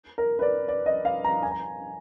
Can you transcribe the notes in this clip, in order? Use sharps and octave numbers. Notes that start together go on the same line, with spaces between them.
A#4
B4
D5
D5
D#5
F5
A#5
G#5
A#5